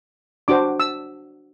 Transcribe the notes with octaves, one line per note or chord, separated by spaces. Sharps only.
D4 F#4 C5 D6
E6